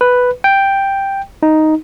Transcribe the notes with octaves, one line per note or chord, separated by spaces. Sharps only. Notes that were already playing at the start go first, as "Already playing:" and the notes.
B4
G5
D#4